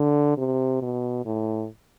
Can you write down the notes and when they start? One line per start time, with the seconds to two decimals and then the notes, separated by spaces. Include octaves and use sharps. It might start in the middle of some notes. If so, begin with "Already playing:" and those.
Already playing: D3
0.38 C3
0.82 B2
1.26 A2